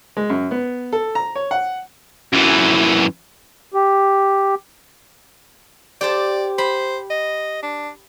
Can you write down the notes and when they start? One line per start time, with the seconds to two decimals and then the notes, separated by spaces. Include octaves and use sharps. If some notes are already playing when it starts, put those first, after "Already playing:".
0.17 G#3
0.30 F#2
0.51 B3
0.93 A4
1.15 A#5
1.36 C#5
1.51 F#5
2.33 F#2 E3
3.74 G4
6.01 G4 C5 D5 A5
6.58 C5 B5
7.10 D#5
7.63 D4